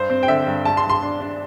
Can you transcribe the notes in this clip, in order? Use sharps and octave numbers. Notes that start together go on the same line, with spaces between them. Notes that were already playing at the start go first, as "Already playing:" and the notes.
Already playing: G2 C5
C4
G5
D3 E5
G2
G2 A5
C6
G2
C6
D4
D4